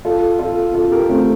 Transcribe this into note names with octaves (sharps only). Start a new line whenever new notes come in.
F4 A4
F4 A4
F4 A4
G4 A#4
A3 C4